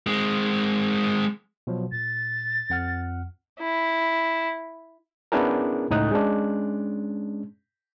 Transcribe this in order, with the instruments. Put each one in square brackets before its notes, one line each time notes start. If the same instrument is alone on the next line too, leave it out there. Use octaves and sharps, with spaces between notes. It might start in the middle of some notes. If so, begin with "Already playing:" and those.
[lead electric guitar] G#3 C4
[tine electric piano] B2 F3 F#3
[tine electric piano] A#2 [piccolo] A6
[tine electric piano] F2 F#5 F6
[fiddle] E4
[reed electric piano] B3 C#4 D4 E4 G#4 A#4
C#2 A2 D#4 D#6 F#6
G#3 C#4 D4